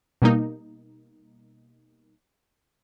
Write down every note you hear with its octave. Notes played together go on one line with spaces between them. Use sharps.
B2 G3 A#3 D#4